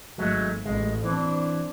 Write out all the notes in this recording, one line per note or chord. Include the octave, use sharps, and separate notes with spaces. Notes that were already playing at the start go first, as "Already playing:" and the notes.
G#1 F#3 G#3 A3
A1 G#3
E3 C4 D4